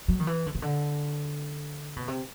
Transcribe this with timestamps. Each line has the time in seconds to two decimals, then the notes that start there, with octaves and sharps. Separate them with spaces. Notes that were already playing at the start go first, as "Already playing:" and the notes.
0.08 F#3
0.20 D#3
0.27 E3
0.46 D3
0.55 C#3
0.62 D3
1.96 B2
2.08 C3